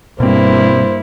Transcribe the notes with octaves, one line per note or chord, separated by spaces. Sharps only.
G2 B2 A#3 C4 E4 C5